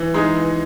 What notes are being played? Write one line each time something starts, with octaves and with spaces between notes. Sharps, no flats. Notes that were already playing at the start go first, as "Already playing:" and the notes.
Already playing: E3
G#3 D#4 G#4
E3